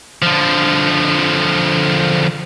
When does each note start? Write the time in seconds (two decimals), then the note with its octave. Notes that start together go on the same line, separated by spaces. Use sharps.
0.22 D3 F3